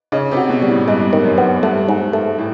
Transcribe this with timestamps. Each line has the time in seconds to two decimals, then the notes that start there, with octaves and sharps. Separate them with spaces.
0.12 C#3 D#4
0.31 C3
0.37 F#4
0.49 B2
0.62 G3
0.68 A2
0.88 G2 G#3
1.13 D#3
1.25 F#2
1.38 B3
1.63 G2 A3
1.89 G#2
2.13 A3
2.38 A2